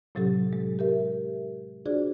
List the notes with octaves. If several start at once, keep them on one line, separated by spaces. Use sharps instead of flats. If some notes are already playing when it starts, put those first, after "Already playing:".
A2 C3 F#3 C#4 G4 A4
G#3
G4 A#4 E5
D4 F4 F#4 G#4 C5 D5